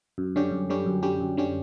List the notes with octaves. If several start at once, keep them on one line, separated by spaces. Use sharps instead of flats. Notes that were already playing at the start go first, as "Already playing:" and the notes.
F#2
D3 G3 C#4 G4
F#2
D3 G3 C#4 G4
F#2
D3 G3 C#4 G4
F#2
D3 G3 C#4 G4